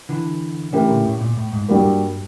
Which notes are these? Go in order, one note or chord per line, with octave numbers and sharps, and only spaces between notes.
D3 E3
D3 E3 A3 C#4 E4 G4 A#4
A#2
A2
A#2
A2
G#2
G2 G3 A#3 D4 F#4 A#4
G#2
G2